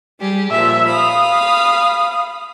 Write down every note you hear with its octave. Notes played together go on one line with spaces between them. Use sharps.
G3 G4 G#4
A#2 F3 E5
F5 B5 D#6